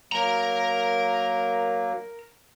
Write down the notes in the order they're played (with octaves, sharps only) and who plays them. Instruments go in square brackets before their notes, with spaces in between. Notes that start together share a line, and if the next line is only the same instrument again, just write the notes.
[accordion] F#3 A#3 [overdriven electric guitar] A#4 A#5